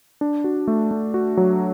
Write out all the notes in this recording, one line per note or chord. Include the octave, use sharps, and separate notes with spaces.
D4
F#4
A3
A3
F#4
F#3